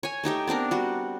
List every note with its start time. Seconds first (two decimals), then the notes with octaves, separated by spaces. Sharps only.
0.03 C#5 G#5
0.24 A3 D#4 G4 E5
0.47 B3 C4 D4 A#4
0.71 G3 F#4